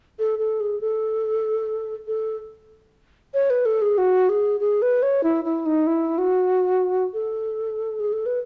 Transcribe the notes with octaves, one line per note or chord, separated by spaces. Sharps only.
A4
A4
G#4
A4
A4
C#5
B4
A4
G#4
F#4
G#4
G#4
B4
C#5
E4
E4
D#4
E4
F#4
A4
G#4
A4
B4